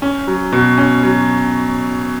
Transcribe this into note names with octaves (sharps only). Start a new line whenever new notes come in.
C#4
F#3
B2
C#4
F#3